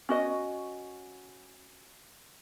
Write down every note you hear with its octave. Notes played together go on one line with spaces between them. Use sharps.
C#4 F#4 D#5